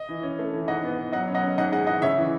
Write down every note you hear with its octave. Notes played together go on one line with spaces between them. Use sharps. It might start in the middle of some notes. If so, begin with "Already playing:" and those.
Already playing: D#5
E3
C#4
A3
E3
G#2 D#5 F#5
B3
B3
F#3 D#5 F#5
C#4
D#5 F#5
C#4
G#2 D#5 F#5
G#3 D#5 F#5
E3 D#5 F#5
C#3 C#5 E5
E3